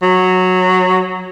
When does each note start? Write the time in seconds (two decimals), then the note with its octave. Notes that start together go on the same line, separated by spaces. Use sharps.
0.03 F#3